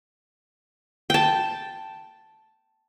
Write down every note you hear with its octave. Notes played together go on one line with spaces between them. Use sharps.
G5 A5